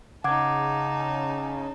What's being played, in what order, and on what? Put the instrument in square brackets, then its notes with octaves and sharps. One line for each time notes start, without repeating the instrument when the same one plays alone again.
[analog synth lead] C#3 [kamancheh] D#4 A5 [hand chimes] F#5 D6 G#6